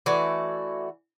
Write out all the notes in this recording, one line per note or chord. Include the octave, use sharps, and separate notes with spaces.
E3 A3 F#4 D5